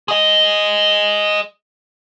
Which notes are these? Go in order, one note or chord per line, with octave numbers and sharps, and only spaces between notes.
G#4 D#5